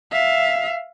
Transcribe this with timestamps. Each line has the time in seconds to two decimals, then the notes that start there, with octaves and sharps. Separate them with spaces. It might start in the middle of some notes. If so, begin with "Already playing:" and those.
0.12 E5 F5